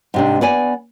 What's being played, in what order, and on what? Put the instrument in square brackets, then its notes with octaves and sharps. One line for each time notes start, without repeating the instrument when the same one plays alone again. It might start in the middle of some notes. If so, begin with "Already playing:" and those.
[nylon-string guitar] G#2 C3 D4
B3 D5 G#5